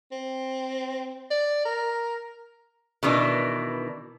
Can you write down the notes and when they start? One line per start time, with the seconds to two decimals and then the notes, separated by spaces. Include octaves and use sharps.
0.12 C4
1.30 D5
1.65 A#4
3.03 B2 D#3 E3 D4